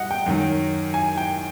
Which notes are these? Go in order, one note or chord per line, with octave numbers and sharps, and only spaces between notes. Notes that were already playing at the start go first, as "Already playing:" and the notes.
Already playing: G2 D#5 F#5
G5
F#2 D#3 F#3
G#5
G5